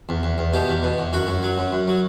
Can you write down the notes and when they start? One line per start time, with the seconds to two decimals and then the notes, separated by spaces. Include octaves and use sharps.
0.09 E2
0.23 E2
0.38 E2
0.53 B2 G4
0.68 E2
0.83 B2
0.98 E2
1.13 F#2 F#4
1.27 F#2
1.43 F#3
1.58 F#2
1.72 F#2
1.88 F#3